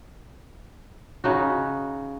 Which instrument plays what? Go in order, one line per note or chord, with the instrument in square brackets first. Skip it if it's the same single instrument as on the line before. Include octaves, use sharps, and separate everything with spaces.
[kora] C#3 D#4 F#4